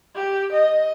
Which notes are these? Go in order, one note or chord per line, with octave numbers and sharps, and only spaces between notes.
G4
D#5